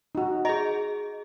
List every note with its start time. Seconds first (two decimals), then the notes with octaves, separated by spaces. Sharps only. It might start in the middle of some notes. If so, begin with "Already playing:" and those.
0.15 D#4 F#4
0.45 G#4 D#5 A#5